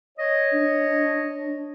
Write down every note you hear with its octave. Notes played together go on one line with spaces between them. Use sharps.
C#5 D#5
D4